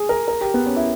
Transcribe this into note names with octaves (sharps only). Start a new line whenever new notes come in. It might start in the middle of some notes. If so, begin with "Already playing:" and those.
Already playing: G#4
A#4
A#4
G4
B3
C#4
E4